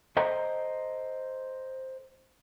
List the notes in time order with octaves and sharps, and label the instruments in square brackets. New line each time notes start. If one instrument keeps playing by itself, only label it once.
[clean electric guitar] A4 C5 D#5 G5 A#5